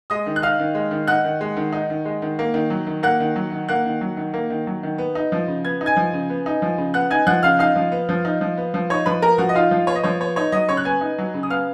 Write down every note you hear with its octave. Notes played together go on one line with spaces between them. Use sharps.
G#3 D#5 D#6
D#3
F#6
D#4 F5 F6
D#3
G#3
D#3
D#4 F#5 F#6
D#3
G#3
D#3
D#4
D#3
G#3
D#3
A#3
D#3
F#3
D#3
A#3 F#5 F#6
D#3
F#3
D#3
A#3 F#5 F#6
D#3
F#3
D#3
A#3
D#3
F#3
D#3
B3
D#4
F3
C#3
B3 G#6
D#4
G#5 G#6
F3
C#3
B3
D#4
F3
C#3
B3 F#5 F#6
D#4 G#5 G#6
F3 F#5 F#6
C#3 F5 F6
D#4 F5 F6
F3
B3
F3
D#4
F3
B3
F3
D#4 C#5 C#6
F3 B4 B5
B3 A#4 A#5
F3 F#4 F#5
D#5
D#4 F4 F5
F3
B3 C#5
D#5
F3 C#5
B3 C#5
D#4 C#5
F#3 D#5
C#3 C#5 C#6
F#6
B3 G#5 G#6
D#4
F#3
C#3
D#6
B3 F5 F6